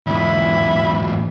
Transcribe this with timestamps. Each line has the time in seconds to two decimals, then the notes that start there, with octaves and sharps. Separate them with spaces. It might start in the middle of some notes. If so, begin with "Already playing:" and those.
0.07 E2 G#2 E4